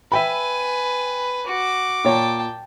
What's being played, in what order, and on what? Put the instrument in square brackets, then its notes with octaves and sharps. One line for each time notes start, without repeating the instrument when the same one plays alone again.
[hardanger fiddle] B4 G#5 [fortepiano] E5 G5 B5
[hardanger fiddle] F#4 [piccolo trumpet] D6
[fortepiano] A#2 C#5 [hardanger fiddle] G5 A5